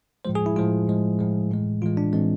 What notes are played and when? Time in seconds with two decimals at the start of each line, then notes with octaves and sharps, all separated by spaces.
0.25 A2 F3 G#3 C5
0.35 G#4
0.46 E4
0.56 A2 F3 G#3 F4
0.88 A2 F3 G#3
1.19 A2 F3 G#3
1.51 A2 E3 G#3
1.82 A2 E3 G#3 F4
1.97 D4
2.13 A2 E3 G#3 C4